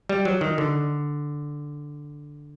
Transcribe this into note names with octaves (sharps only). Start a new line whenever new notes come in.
G3
F#3
D#3
D3